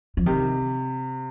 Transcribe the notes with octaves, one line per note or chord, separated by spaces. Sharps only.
F3
C3 D#3